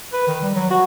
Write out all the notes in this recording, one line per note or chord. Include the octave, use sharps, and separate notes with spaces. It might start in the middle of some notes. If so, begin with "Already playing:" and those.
B4
D#3
G3
F#3
F#4